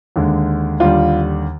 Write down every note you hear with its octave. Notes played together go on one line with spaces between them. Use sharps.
D#2 D3 G#3
D#2 D3 G3 F4